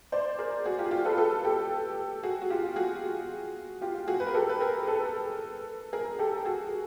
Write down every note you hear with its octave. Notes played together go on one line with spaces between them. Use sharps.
C5 D5
G#4 A#4
F#4 G#4
F4 G4
G#4
F4 G4
A4 B4
A4 B4
G4 A4
F#4 G#4
F#4
F4 G4
F#4 G#4
F4 G4
F#4 G#4
B4
A#4
G4 A4
B4
G#4 A#4
A4 B4
G#4 A#4
G4 A4
F#4 G#4